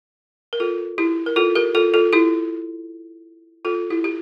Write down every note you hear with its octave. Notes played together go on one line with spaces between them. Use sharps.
A#4
F4 A4
E4 G4
A#4
F4 A4
G4 A#4
F4 A4
F4 A4
E4 G4
F4 A4
E4 G4
G4